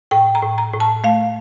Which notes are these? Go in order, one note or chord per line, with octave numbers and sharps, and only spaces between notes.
A2 G5
A#5
A2
A#5
A2
A5
A3 F5